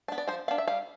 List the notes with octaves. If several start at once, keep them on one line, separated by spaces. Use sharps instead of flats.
B3 D4
D5
F3 C5
B3 D4 F5
E5
G3 F5